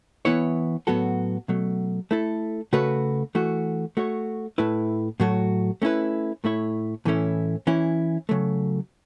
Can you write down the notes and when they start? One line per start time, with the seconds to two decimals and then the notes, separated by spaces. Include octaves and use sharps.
0.25 E3 B3 E4 C#5
0.87 A2 F#3 B3 F#4 A4
1.48 B2 F#3 A3
2.11 A3 E4 A4
2.73 C#3 A3 F#4 B4
3.35 E3 A3 F#4
3.97 A3 F#4 C#5
4.58 A2 A3 E4 B4
5.20 A2 F#3 A3 F#4
5.82 A3 C#4 E4 B4
6.44 A2 A3 E4 C#5
7.05 A2 E3 A3 C#4 E4
7.67 E3 C#4 E4
8.29 C#3 F#3 A3